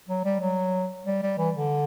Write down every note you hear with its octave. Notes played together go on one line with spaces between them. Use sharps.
F#3
G3
F#3
G3
G3
E3
D3